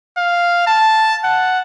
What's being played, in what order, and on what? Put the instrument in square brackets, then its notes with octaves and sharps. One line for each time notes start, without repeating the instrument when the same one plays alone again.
[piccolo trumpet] F5
A5
F#5